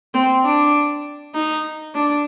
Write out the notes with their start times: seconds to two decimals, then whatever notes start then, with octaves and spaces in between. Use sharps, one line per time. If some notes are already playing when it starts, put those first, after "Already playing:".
0.14 C4
0.44 D4
1.35 D#4
1.95 D4